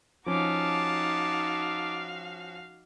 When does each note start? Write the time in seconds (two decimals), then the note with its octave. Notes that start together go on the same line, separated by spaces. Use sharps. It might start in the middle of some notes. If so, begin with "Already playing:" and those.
0.26 F3 C#4 D#4 F#4 F5 A5 D6